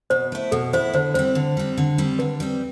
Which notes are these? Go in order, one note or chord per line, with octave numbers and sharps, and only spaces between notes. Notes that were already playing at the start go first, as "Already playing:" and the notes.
B2 C5
A3 E4
B2 A4
A3 E4 C5
D3 C5
G3 C4 C5
D3
G3 C4
D3
G3 C4
D3 B4
G3 C4